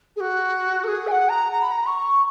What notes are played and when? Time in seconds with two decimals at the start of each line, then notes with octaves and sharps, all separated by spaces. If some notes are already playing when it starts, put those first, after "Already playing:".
0.16 G#4
0.20 F#4
0.84 A#4
0.87 G#4
1.07 G#5
1.11 F#5
1.29 A#5
1.52 A#5
1.62 B5
1.71 A#5
1.86 C#6